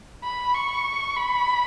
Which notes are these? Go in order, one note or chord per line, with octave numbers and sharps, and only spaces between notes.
B5
C#6
B5